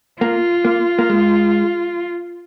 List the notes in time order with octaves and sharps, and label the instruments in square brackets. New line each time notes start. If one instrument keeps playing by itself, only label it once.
[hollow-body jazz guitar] A#3 [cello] F4
[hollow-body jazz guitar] A#3
A#3
G#3